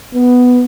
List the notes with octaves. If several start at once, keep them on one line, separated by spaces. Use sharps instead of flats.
B3